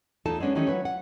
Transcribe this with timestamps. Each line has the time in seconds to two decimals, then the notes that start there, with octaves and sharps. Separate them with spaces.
0.25 E2 A3 D#4 F4 A4 A5
0.40 G#3 B3 C#4 D4 D#5
0.55 D#3 E3 G3 A3 C#4 D#4
0.67 F#3 F4 B4 C#5
0.85 F#5